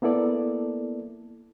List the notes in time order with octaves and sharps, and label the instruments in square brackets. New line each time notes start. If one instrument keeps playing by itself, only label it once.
[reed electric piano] A#3 B3 E4 A4 D5